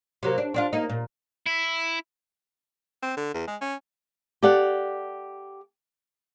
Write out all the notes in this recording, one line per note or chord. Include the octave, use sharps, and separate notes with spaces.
C3 F#3 A#3
D4
C4 D4 F4
A#3 D#4
A#2
E4
C4
D3
E2
G#3
C#4
G4 A4 D5 F5 F#5